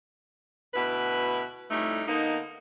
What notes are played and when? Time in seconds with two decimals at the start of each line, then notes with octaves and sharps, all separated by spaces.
0.74 D2 B2 E4 B4
1.71 F2 A2 G3 A3 D#4
2.07 D3 A#3 B3 D#4